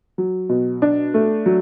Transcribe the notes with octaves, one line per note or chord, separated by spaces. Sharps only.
F#3
B2
D4
A3
F#3